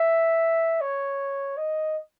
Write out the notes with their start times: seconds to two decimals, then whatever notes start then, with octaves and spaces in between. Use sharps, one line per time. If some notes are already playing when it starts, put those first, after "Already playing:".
Already playing: E5
0.81 C#5
1.57 D#5